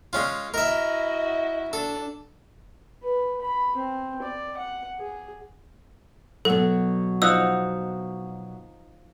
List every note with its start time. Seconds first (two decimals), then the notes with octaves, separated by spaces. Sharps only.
0.13 G#3 C#4 F4
0.54 E4 F#4 A#4 D#5 E5
1.73 D4 A4
3.03 B4
3.42 B5
3.76 C4
4.22 D5
4.57 F#5
4.99 G#4
6.45 B2 F#3 A4
7.22 F3 D#4 F#5 E6